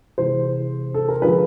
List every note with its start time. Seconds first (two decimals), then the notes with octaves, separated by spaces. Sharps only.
0.18 C3 E3 G#3 C5
0.94 A4
1.09 A#4
1.22 D3 F3 G#3 B4